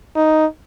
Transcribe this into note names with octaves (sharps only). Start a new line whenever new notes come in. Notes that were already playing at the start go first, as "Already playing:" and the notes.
D#4